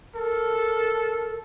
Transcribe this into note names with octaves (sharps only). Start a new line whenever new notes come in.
A4 A#4